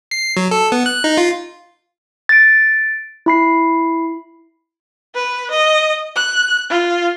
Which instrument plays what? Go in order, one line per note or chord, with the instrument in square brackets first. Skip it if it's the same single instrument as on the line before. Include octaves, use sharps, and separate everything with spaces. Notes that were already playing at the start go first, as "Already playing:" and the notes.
[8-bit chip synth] C7
F#3
A4
B3
F#6
D#4
F4
[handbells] A6 D7
E4 B5 C7
[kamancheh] B4
D#5
F#6
F4